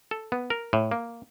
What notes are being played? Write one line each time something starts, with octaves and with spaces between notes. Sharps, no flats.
A4
B3
A#4
A2
A#3